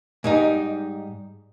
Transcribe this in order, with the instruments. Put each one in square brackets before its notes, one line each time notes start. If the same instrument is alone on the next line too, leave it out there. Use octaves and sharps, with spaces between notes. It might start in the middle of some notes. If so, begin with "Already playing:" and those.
[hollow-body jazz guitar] G#2 G3 D#4